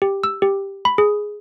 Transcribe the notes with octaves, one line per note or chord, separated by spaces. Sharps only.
G4
E6
G4
B5
G#4